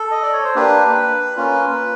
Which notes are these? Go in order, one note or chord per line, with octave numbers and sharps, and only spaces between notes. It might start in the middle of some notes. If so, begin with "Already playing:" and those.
Already playing: A4
D#5
D5
C#5
C5
A#3 D4 G4 B4
A#3 C#4 F4